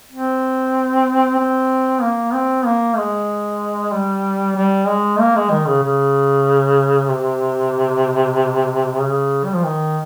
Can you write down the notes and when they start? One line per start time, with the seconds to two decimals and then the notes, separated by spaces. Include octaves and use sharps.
0.12 C4
1.38 C4
2.02 A#3
2.34 C4
2.66 A#3
2.97 G#3
3.92 G3
4.56 G3
4.87 G#3
5.20 A#3
5.36 G#3
5.51 D#3
5.68 C#3
5.83 C#3
7.10 C3
9.01 C#3
9.45 G3
9.54 F3
9.65 D#3